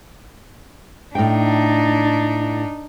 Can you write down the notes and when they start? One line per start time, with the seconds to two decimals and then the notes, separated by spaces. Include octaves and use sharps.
1.15 A2 D4 D#4 G5